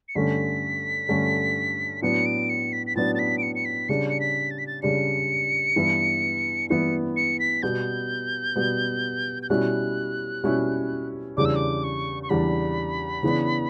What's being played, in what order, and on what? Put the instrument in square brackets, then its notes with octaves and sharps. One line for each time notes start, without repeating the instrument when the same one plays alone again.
[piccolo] C#7
[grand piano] G2 D3 A3 C#4 [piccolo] B6
[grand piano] G2 D3 A3 C#4
[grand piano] A2 F#3 B3 D4 [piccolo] C#7
[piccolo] D7
C#7
B6
B6
[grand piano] A2 F#3 B3 D4 [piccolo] A6
[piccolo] A6
B6
D7
C#7
C#7
B6
[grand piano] C#3 G3 D4 [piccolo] C#7
[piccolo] C#7
B6
A6
B6
A6
[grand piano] C#3 G3 D4 [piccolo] C#7
[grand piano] G2 E3 B3 E4
[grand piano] G2 E3 B3 E4 [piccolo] C#7
[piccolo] C#7
B6
[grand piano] B2 G3 B3 [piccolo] G6
[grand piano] B2 G3 B3
[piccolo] G6
[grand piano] B2 G3 C#4 E4 [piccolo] F#6
[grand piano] B2 G3 C#4 E4
[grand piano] E2 C#3 G3 D4 [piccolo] D6
[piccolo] E6
D6
C#6
C#6
[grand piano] E2 C#3 G3 D4 [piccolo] B5
[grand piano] C#3 E3 B3 D4